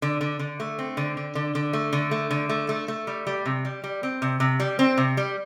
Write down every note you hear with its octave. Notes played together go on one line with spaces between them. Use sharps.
D3
D3
D3
A3
C4
D3
D3
D3
D3
A3
D3
A3
D3
A3
A3
A3
G3
G3
C3
G3
G3
C4
C3
C3
G3
C4
C3
G3